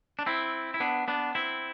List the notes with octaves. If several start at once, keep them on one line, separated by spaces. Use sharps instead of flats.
D4
C4 E4
E4
B3 D4
B3 D4
C4 E4